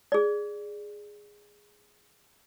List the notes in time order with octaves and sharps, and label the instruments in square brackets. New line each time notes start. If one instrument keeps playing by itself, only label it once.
[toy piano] G#4 D5